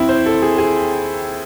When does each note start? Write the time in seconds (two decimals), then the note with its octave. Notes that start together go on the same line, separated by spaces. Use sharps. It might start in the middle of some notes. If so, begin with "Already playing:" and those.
Already playing: D#2 C4 E4
0.09 C5
0.26 A4
0.42 G#4
0.58 G#4